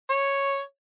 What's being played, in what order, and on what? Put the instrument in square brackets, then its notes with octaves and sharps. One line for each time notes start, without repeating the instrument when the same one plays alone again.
[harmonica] C#5